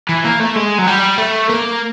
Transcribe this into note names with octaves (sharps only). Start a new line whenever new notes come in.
E3
A#3
A3
G#3
F#3
G3
A3
A#3